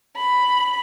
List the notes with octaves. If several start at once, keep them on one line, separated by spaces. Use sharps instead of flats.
B5